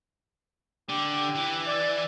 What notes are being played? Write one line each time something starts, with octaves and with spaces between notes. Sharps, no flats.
D3 G4
E3
D5